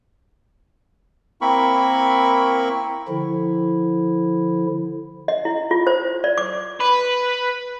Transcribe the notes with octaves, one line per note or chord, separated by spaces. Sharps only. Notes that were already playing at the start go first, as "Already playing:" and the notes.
A#3 C4 E4 A#4 B5 C#6
D3 F3 E4
D#5
E4
F4
C5
D5
D6
B4